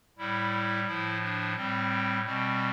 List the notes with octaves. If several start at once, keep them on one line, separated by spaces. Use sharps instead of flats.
A2 G3 E4
A2 F3 E4
D4
A2 G3 C4
B2 G3 C4